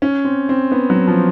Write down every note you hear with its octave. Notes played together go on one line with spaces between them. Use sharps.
C#4
C4
C4
B3
F#3
F3